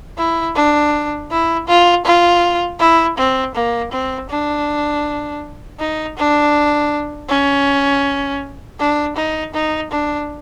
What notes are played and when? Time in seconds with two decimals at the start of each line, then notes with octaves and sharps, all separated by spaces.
0.18 E4
0.56 D4
1.30 E4
1.68 F4
2.05 F4
2.80 E4
3.17 C4
3.55 A#3
3.92 C4
4.30 D4
5.79 D#4
6.18 D4
7.29 C#4
8.79 D4
9.17 D#4
9.54 D#4
9.91 D4